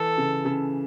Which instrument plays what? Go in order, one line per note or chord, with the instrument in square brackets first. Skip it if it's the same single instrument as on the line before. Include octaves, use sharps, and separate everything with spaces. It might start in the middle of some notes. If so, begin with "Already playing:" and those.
Already playing: [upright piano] E3 [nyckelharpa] A4
[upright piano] C#3
C#3